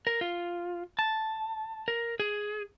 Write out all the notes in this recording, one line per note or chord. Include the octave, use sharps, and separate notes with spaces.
A#4
F4
A5
A#4
G#4